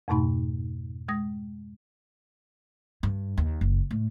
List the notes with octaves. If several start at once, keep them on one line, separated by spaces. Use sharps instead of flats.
F2 G#2 B2 A3 D#4 B5
G#3 D#6 A#6
G2
D#2
F#1
A2